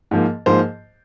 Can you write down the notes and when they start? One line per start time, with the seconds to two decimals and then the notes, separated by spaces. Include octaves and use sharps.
0.11 G#2 F3 A#3
0.46 G#2 F3 A#3 C5